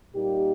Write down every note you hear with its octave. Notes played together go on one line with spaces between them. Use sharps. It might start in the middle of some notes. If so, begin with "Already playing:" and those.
A#2 G3 A#3 D#4 G4